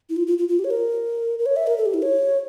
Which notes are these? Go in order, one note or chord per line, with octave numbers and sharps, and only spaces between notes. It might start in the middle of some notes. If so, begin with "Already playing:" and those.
E4
F4
F4
F4
F4
G4
C#5
A#4
A#4
C#5
E5
A#4
A4
G4
E4
C#5